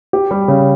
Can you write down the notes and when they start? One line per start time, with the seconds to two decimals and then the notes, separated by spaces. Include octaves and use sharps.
0.13 G4
0.31 G3
0.48 C#3